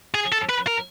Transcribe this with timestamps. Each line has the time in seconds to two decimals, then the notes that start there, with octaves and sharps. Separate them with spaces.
0.14 G#4
0.32 A4
0.49 B4
0.67 A#4